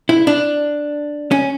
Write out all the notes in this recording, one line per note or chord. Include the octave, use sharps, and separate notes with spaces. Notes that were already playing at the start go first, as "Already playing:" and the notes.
E4
D4
C#4